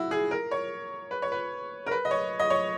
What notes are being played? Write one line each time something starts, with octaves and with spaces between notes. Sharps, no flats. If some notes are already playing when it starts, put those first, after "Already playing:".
Already playing: E4 F#4
G#4
A#4
C#5
B4
C#5
B4
A#4
B4
D#5
C#5
D#5
C#5